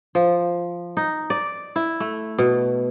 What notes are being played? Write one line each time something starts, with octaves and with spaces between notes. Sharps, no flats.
F3
D#4
D5
E4
A3
B2